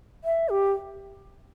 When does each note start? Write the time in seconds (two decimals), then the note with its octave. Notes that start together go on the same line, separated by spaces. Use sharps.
0.24 E5
0.49 G4